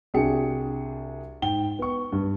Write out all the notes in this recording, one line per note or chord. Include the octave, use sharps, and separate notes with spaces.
C2 D4 F#4 G#4 G5 C#7
G#2 G5 G7
B3 C#6
G2